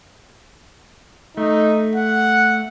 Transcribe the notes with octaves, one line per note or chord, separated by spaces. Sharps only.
A3 D#4
F#5